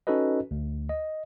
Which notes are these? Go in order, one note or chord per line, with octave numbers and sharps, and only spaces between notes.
C#4 D#4 F#4 A4 B4 D#5
D2
D#5